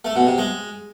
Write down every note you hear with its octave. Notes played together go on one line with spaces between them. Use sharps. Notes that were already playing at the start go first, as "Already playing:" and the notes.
A3
B2
C3
G#3